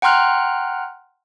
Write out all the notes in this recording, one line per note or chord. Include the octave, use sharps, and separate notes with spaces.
F#5 G5 A#5 C6 F6 F#6